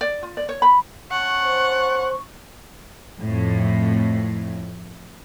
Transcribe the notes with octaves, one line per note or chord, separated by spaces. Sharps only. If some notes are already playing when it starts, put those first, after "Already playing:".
D5
F4
D5
C#5
B5
C#4 F#5 A5 C#6
C5
F2 A2